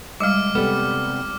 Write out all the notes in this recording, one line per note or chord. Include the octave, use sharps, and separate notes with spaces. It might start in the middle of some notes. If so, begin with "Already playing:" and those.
G3 G#3 F5 D6 F6
C3 G3 B3 A4